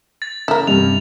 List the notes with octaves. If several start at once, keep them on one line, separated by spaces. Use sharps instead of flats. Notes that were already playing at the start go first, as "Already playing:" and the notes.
A6
C#3 E4 A#4
G2 C3 F7